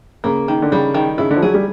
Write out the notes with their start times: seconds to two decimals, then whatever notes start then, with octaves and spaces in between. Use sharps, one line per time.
0.24 C#3 A#3
0.48 D#3
0.62 D3
0.72 C#3 G3
0.94 D#3
1.18 C#3 E4
1.31 D3
1.36 F3
1.42 F#3 G#4
1.54 G3